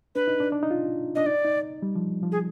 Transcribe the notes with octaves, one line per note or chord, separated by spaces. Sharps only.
D4 B4
D#4
D4
D4
D#4
F4
D4 D#5
D#4 D5
D#4
G3
F3
F3
G#4